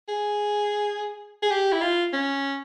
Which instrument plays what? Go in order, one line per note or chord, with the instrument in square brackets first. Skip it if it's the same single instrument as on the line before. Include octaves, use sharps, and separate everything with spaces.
[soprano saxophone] G#4
G#4
G4
E4
F4
C#4